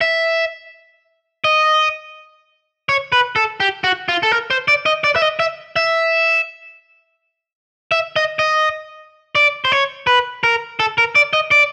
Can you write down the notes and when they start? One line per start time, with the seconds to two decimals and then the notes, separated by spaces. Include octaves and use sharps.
0.01 E5
1.44 D#5
2.89 C#5
3.12 B4
3.36 A4
3.60 G4
3.84 F#4
4.09 F4
4.23 A4
4.32 A#4
4.50 C5
4.68 D5
4.86 D#5
5.04 D5
5.16 E5
5.22 D#5
5.39 E5
5.76 E5
7.92 E5
8.16 D#5
8.39 D#5
9.35 D5
9.65 C5
9.72 C#5
10.07 B4
10.44 A#4
10.80 A4
10.98 A#4
11.15 D5
11.33 D#5
11.51 D5